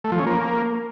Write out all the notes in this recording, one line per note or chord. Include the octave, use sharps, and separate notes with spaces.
A3
F3
C#4
A#3